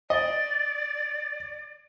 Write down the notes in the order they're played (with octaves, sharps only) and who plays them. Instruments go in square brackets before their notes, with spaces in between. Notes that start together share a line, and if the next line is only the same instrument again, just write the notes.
[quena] D5 [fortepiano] D#5